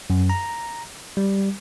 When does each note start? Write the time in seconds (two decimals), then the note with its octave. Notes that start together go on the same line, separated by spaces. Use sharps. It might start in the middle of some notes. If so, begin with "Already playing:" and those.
0.10 F#2
0.30 A#5
1.17 G3